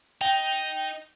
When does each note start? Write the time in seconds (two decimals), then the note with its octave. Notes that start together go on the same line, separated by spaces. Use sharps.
0.21 D#4 G5